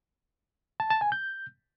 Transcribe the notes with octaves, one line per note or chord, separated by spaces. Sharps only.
A5
A5
G#5
G6